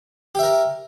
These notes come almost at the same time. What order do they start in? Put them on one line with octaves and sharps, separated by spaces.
G4 E5 A#4